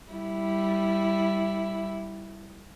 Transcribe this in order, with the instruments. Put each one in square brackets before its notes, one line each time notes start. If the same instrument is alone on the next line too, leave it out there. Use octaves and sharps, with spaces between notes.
[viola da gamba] G3 E4